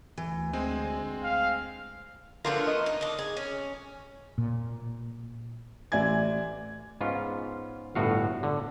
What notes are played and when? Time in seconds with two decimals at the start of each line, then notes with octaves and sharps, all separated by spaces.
0.17 D2 E3
0.53 G#3 C4 G#5
1.24 F5
2.45 D3 F3 A3 B3 F4 A#4
2.67 D#5
2.86 D#4
3.01 D4 D#4
3.19 G#4
3.37 C#4
4.38 A#2
5.92 A1 D5 E5 G#5 G#6
7.01 G#2 B3 C#4 F4
7.95 G1 A2 F#4 F5
8.43 D3